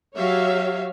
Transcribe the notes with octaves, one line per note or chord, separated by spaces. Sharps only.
F#3 G4 C#5 E5 F5